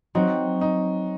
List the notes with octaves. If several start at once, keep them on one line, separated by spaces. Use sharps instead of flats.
F#3 C4 D#4 F#4
D#4